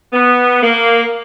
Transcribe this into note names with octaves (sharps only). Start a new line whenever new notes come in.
B3
A#3